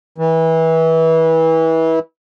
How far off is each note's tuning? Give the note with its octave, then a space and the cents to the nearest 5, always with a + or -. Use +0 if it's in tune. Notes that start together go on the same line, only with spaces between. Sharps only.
E3 -25